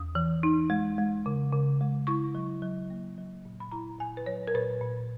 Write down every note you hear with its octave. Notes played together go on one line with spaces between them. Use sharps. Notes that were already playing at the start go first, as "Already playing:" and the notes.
Already playing: E2 D#6
E3
D#4
G#3
G#3
C#3
C#3
G#3
E4 C#6
F#3
F#3
A#3
F#3
A#2
B5
E4 A#5
A#2 G#5
B4
F#3 C#5
A#4
A#2 B4
A#2